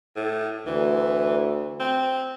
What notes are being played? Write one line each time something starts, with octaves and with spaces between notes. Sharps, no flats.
A2
D2 E3
C4